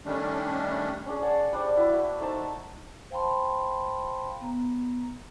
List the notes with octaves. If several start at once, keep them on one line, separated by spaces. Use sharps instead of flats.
D#3 G3 A3 C#4 D4
C#4 D4 G#4
G#4 C#5 F#5 A5
G3 D4 C5 D5
E4 F#4
E4 F#4 B4
A3 D#4 C5 A5
C5 F5 G5 A5 B5 C6
B3 A#5